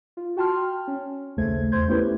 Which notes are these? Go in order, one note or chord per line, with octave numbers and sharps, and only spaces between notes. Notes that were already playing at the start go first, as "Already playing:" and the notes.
F4
F#4 G5 A5 C6 F6
C#4
A#1 D#2 C#3 A3 C5 G#6
E2 C5 C6 G6 G#6
A3 B3 C#4 E4 G4 B4